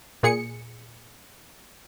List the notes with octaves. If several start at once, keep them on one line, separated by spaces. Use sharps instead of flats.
A#2 G#4 C#7